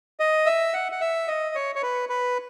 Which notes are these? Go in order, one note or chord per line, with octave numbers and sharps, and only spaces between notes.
D#5
E5
F#5
F#5
E5
D#5
C#5
C#5
B4
B4